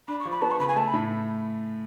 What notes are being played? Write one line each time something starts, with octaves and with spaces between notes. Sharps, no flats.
D4 B5
C#6
F3
B5
B3 A5
C#6
C#3 B5
G#5
A3 A5
B5
A2